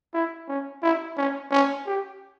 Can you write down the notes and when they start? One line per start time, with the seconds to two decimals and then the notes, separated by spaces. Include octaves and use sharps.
0.14 E4
0.48 C#4
0.82 E4
1.17 C#4
1.51 C#4
1.86 G4